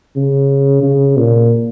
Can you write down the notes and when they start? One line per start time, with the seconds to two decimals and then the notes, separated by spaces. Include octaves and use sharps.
0.16 C#3
0.83 C#3
1.17 A#2